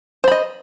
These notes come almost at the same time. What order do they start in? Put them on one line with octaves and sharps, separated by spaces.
C5 B5 D#5